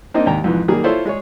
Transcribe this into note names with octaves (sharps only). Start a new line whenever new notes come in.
A#3 C4 D4 D#4 D#5
D#2 G#2 G5 A#5
F2 G#2 E3
D#3 F#3 G3 A#3 G#4
E4 F4 A4 C5 C#5
G#3 G#4 C#5